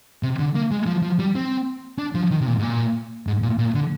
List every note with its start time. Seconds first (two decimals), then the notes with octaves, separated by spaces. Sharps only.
0.23 C3
0.39 D3
0.55 A#3
0.72 G#3
0.87 F3
1.03 F3
1.19 G3
1.35 C4
1.99 D4
2.15 F3
2.31 D#3
2.41 C3
2.47 A#2
2.58 G#2
2.63 A#2
3.27 G#2
3.42 A#2
3.58 A#2
3.75 D3